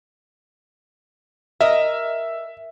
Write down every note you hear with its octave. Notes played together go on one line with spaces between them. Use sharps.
A#4 D#5 E5